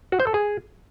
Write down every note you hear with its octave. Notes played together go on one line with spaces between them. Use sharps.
F#4
C5
A4
G#4